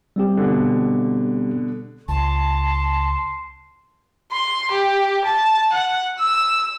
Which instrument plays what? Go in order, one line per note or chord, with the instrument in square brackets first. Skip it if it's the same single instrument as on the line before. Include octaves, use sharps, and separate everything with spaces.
[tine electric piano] G3 C4 G4
[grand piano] B2 D3
[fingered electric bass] C#2 [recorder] A5 [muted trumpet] C6
[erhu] C6
G4
A5
F#5
E6